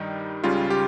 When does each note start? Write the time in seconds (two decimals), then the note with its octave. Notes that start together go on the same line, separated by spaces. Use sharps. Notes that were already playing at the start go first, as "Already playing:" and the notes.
Already playing: G2 D#3 G3 D#4
0.44 C#2 C#3 G3 F4
0.70 G4